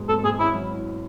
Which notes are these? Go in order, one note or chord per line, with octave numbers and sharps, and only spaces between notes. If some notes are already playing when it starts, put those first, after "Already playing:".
Already playing: E1 G#2 G#3
G#1 A4
G#1 G#4
C#4 E4
F#3
E4